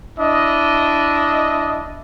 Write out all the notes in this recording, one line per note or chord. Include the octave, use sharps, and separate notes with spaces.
D4 E4 D#5